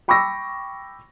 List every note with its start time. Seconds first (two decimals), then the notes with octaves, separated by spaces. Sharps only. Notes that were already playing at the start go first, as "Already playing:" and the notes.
0.08 G5 B5 C#6 D6 E6 A#6